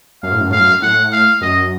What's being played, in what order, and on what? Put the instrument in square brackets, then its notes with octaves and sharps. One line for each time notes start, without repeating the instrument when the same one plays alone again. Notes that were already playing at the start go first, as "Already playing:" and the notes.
[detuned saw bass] F#2 [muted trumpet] F5
[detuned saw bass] A2
F#2
[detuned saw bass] A2 [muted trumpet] F5
[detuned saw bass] F#2
[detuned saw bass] A2 [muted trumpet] F#5
[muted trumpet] F5
[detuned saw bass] F#2 [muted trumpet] D#5